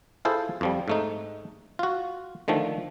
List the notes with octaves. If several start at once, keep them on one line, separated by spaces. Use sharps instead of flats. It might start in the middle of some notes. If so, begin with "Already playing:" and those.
E4 F4 G#4 A4 C5
F2 F3 G3
G#2 A3 D#4
F4 F#4
D3 D#3 F3 A3